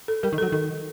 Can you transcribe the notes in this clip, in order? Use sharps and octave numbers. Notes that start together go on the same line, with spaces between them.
A4
G3 A#4
D#3
F#3 A4
D#3 A4